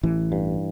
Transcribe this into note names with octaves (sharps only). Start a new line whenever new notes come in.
A1 E3
G2